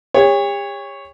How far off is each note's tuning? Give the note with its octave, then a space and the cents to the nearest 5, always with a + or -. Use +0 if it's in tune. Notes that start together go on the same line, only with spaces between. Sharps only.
G4 +45 C#5 +0